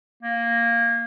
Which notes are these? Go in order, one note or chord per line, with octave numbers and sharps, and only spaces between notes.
A#3